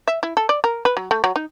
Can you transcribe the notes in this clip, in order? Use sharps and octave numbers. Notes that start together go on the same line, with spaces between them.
E5
E4
A4
D5
A#4
B4
F#3
A3
F#3
D#4